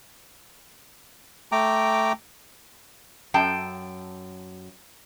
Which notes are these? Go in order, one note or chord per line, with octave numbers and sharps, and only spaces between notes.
A3 G5 A#5 D6
F#2 G5 A5